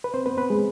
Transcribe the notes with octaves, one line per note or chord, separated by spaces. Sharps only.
B4
C4 C5
B3 B4
B3 B4
G#3 G#4